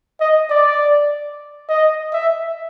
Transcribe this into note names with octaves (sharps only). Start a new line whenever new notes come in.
D#5
D5
D#5
E5